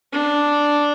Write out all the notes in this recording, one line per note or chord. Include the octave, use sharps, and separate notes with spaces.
D4